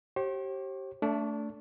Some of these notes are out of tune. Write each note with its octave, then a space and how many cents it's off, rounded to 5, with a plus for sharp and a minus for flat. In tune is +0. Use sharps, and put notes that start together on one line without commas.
G4 -25 C5 +45
A3 +10 D4 -25